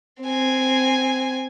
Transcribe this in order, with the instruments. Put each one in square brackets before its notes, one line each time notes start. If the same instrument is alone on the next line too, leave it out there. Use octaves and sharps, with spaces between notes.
[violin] C4 G#5